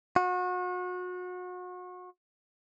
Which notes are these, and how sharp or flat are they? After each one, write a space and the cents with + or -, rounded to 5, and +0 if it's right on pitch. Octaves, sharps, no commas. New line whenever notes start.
F#4 -35